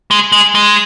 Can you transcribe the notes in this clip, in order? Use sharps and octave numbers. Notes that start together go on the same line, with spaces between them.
G#3
G#3
G#3